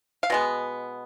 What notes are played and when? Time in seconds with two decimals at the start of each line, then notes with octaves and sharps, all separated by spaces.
0.23 F5
0.30 B2 G#3 B3